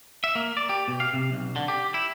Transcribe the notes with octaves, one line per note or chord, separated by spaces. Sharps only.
E5
A#3
D5
G4
B2
F5
C3
B1
D3
G4
E4